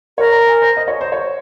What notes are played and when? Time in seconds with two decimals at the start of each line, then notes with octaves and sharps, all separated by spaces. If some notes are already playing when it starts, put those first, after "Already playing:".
0.18 A#4 C#5
0.32 A#5
0.47 G#5
0.62 C5
0.77 D#5
0.88 C#5
1.01 C5
1.12 C#5